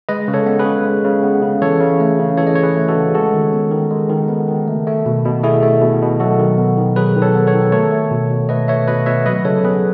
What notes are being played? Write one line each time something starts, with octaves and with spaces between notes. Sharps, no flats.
G#3 B4 D#5
C#3
A4 C#5
B3
G#4 B4
C#3
G#3
C#3
B3
C#3
E3 A4 C#5
C#3
A3
C#3
E3 A4 C#5
D#5
C#3 C#5
G#4 B4
A3
F#4 A4
C#3
G#3 F#4 A4
D#3
B3
D#3
G#3
D#3
B3
D#3
A3
A3
B2
B2
A3 E4 G#4
A3
B2
B2
F#3 F#4 A4
D#3
B3
D#3
F#3 G#4 B4
D#3
A4 C#5
B3
A4 C#5
D#3
A3 A4 C#5
A3
B2
B2
A3 B4 D#5
A3 C#5 E5
B2 B4 D#5
B2 C#5 E5
F#3 B4 D#5
C#3 A4 C#5
B3 G#4 B4